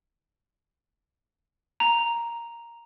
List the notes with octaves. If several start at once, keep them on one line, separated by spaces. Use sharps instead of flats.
A#5